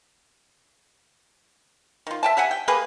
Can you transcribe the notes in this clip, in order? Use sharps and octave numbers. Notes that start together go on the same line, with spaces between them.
D#3 F4
E5 G5 A5
G4 E5 F#5 G#5
G5
A#3 G4 G#4 B4